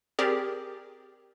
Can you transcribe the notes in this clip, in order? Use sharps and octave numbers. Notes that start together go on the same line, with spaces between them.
C4 G4 G#4 A#4 D5